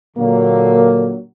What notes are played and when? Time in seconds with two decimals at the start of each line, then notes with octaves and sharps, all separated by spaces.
0.17 A#2 D3 F#3 A#3